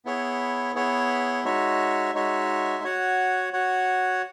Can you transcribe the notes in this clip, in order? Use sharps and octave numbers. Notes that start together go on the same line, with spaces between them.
B3 E4 G#4 C#5
B3 E4 G#4 C#5
G#3 D#4 F#4 C#5 E5
G#3 D#4 F#4 C#5 E5
F#4 C#5 F#5
F#4 C#5 F#5